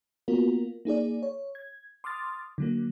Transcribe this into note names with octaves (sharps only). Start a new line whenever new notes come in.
A#3 B3 F4 F#4 A#4
A#3 D#4 G#4 D5
C#5
G#6
C6 D6 D#6 F6 A6
D3 F#3 A#3